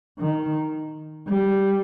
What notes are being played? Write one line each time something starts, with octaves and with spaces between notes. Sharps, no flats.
D#3
G3